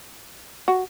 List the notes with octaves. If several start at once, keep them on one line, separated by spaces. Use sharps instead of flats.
F#4